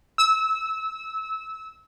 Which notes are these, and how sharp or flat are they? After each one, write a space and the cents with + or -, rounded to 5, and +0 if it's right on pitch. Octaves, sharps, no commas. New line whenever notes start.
E6 -25